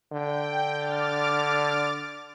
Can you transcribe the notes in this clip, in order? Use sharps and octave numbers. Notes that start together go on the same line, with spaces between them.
D3 G5
D6 F6 A6